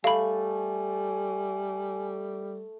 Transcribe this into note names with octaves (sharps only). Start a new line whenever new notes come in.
G3 A3 F5 G#5 B5